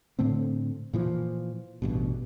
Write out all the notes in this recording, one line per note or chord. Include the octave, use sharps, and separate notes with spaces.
A2 D3 A3 C4
A#2 E3 F3
A1 G2 B2